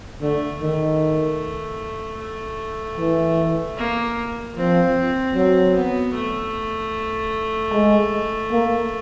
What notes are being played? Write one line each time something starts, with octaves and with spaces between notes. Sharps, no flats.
D3 A3
D#3 A3
A3
E3
A#3
F3 C4
F#3 C4
B3
A3
G#3
A#3